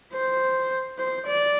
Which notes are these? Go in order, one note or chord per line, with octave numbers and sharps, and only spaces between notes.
C5
C5
D5